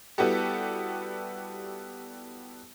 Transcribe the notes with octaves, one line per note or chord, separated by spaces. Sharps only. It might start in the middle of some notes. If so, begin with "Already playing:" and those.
G3 B3 E4 F#4 G4 A4